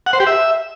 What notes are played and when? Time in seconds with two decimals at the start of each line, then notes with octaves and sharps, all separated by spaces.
0.06 F#5
0.13 C5
0.20 G4
0.27 E5